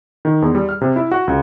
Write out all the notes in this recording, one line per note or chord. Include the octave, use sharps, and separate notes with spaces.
D#3
E2
G3
F6
C3
E4
F#4
C#2